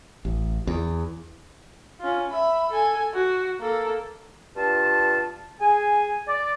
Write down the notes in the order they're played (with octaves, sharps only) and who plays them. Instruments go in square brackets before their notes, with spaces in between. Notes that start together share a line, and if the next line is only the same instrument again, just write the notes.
[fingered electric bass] A1
E2
[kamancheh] C#4 F4
E5 B5
A4 G#5
F#4
A#3 A4
[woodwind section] G2 F4 A5
G#4 G#5
D5